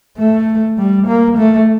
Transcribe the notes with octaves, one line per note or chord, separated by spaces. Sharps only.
A3
G3
A#3
A3